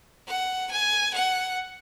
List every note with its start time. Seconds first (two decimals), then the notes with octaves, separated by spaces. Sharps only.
0.28 F#5
0.71 G#5
1.14 F#5